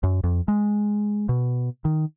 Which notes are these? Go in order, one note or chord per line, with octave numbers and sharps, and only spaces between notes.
F#2
F2
G#3
B2
D#3